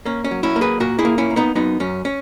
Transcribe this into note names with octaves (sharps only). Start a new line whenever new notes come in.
A#3 C#4
C#4
F#3
C#4 E4
A#3
G#4 B4
A#2 F#4 A#4
E4 G#4
A#3
C#4 E4
A#3
B3 D#4
F#2 B3 D#4
F#2 C#4
C#4